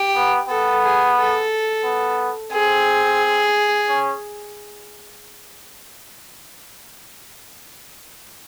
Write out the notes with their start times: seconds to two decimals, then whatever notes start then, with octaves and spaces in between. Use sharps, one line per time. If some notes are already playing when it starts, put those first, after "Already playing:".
Already playing: G4
0.15 B3
0.49 B3 A4
0.83 G#4
1.17 A4
1.84 B3
2.52 C4 G#4
3.89 C#4